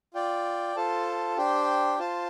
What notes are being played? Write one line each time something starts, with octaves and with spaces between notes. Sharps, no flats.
F4 D5 G5
F4 A4 C5 A5
D4 G4 C5 G5
F4 C5 A5